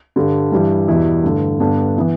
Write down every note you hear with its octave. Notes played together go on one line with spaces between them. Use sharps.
G2 D3 G3
G2 E3 G3 E4
E2 B2 G3 E4
G2 D3 A3
G2 D3 B3 D4
E3 B3